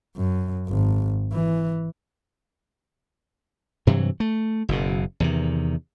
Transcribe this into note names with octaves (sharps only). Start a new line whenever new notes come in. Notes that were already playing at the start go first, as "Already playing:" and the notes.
F#2
G#1
E3
G2 C3 E3 F#3
A3
F#1 F#2 B2
E2 C3 D#3